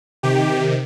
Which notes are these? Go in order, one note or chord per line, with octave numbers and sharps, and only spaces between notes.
C3 D#3 G4